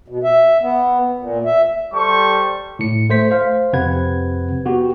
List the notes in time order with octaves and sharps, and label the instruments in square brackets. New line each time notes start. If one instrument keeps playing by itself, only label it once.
[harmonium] B2
E5
B3
A#2
E5
[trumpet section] G3 A4 C5 C#6
[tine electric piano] A2 C#7
A3 C5 B6
C5 F5
F2 C3 C4 B4 F#5 G#6
B3 F#4 G4